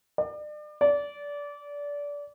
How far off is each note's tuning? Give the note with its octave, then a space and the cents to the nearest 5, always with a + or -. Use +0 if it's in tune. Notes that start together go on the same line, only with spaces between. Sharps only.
D5 +35
D5 -25